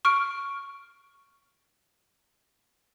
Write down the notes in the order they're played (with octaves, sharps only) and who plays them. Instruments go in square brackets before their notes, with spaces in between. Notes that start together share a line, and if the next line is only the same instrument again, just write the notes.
[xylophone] C#6 F6 D7